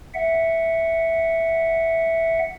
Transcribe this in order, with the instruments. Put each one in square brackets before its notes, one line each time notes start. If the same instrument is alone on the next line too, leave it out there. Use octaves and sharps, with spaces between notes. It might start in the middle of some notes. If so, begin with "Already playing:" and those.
[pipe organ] E5 F#5